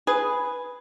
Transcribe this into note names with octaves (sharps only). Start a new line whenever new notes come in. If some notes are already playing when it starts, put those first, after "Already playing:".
G#4 B4